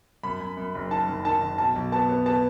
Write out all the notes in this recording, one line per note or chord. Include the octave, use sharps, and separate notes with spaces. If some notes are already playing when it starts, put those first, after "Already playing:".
F#2 B5
F#2
F#2
F#1
D#3 A5
F#2
D#3 A5
D#3
B1 A5
B1
B3 A5
B3
B3 A5